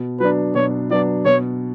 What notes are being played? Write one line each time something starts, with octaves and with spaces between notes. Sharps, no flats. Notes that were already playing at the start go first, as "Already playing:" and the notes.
Already playing: B2
F#3 B3 D4 B4
B2 C#5
F#3 B3 D4 D5
B2 C#5